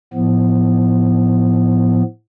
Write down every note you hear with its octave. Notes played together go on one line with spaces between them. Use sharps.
A2 F3 B3